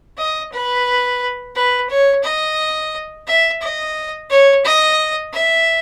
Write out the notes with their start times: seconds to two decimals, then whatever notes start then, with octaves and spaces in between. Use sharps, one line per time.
0.18 D#5
0.52 B4
1.55 B4
1.90 C#5
2.24 D#5
3.27 E5
3.61 D#5
4.30 C#5
4.65 D#5
5.33 E5